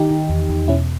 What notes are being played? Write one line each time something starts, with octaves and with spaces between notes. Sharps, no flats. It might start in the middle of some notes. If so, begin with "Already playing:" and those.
Already playing: D#3 D#4 G4
D#3
E2
E2
B2 C#4 E4